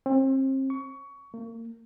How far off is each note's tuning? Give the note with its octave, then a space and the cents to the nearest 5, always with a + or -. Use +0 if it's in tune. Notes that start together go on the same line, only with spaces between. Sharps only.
C4 +35
C#6 +20
A#3 -30